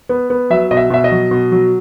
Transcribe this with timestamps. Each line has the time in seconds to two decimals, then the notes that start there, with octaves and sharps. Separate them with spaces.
0.09 B3
0.30 B3
0.50 F#3 E5
0.71 B2 D#5
0.77 E5
0.90 B2 E5
1.04 D#5
1.12 F#3
1.31 B2
1.52 F#3